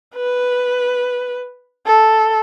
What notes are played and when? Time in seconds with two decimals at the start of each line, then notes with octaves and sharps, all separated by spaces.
0.15 B4
1.86 A4